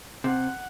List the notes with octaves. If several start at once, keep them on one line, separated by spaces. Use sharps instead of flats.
C3 F#5